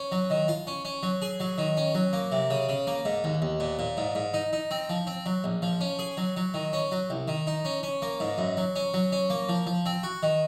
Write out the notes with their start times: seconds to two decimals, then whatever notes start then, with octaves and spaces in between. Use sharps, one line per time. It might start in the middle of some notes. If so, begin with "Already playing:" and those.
Already playing: C#4
0.12 F#3
0.30 D#3
0.48 F4
0.67 C#4
0.85 C#4
1.03 F#3
1.22 G#4
1.40 F#3
1.58 D#3
1.77 C#4
1.95 F#3
2.13 A#3
2.32 C3
2.50 C#3
2.69 C#3
2.87 A#3
3.05 G#2
3.24 D#2
3.42 D#2
3.60 A#2
3.79 A#2
3.97 G#2
4.15 G#2
4.34 D#4
4.53 D#4
4.71 C4
4.90 F3
5.07 C4
5.26 F#3
5.44 A#1
5.62 F3
5.81 C#4
5.99 G#4
6.17 F#3
6.37 F#3
6.54 D#3
6.73 C#4
6.92 F#3
7.10 C2
7.28 D#3
7.47 D#4
7.65 C#4
7.83 C#4
8.02 A#3
8.20 G#2
8.38 F#2
8.57 F#3
8.76 C#4
8.94 F#3
9.12 C#4
9.30 A#3
9.49 F3
9.67 F3
9.86 C4
10.03 F#4
10.23 D#3